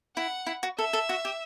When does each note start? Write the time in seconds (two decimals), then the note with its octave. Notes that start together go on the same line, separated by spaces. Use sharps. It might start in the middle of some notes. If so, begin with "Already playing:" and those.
0.16 E4 F#5
0.47 E4
0.63 F#4
0.78 A4 E5
0.93 A4
1.09 F#4
1.25 G4